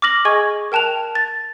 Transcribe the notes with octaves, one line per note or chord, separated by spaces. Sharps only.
D6 F6 A#6 F#7
G#4 D#5 G#5 C#6 G#6
A#4 G5 A5 F#6 F7
A6